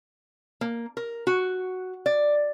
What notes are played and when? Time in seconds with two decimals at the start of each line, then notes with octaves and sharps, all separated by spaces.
0.61 A#3
0.97 A#4
1.27 F#4
2.06 D5